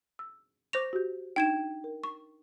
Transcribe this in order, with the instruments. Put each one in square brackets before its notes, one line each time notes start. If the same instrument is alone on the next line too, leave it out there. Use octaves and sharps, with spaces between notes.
[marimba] E6
[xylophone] C5 A#6 F7 [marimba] C#6 D6
[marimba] F#4 G4 G6
[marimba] D4 D#4 [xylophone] G5 G#6 E7
[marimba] A#4
[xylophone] C#6